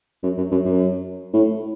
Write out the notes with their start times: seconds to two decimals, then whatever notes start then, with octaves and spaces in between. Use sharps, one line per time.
0.24 F#2
0.38 F#2
0.51 F#2
0.65 F#2
1.34 A2